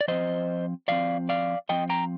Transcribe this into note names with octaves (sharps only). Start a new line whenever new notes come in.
D5
F3 C4 C5 D#5
F3 C4 D5 F5
D5 F5
F3 C4 D#5 G5
G5 A#5